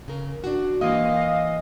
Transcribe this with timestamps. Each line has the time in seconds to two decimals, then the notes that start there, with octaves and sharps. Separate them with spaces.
0.08 C#3 A#4
0.44 D4 F#4
0.81 E3 G#3 A#3 D#5 F5